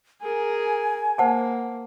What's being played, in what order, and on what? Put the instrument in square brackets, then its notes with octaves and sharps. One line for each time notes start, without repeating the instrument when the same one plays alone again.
[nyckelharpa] G#4 A#4 [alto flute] G#5
[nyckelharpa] A#3 [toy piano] C5 F#5 A5